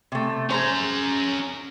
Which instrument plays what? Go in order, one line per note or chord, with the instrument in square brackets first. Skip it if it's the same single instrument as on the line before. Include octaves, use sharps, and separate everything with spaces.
[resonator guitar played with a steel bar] C3 A3
[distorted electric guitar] C#4 A#5 [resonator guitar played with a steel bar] G#4 C5